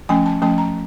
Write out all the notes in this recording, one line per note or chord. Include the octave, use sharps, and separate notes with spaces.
F3 A3 C#4 G#5
A5
F3 A3 C#4 A5
A#5